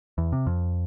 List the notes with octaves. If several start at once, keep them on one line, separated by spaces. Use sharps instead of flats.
E2
C3
F2